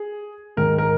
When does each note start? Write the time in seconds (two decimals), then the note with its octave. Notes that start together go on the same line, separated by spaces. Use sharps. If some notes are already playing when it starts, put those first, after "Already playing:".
Already playing: G#4
0.57 G#2 D#3 G#3 A#4
0.78 A#4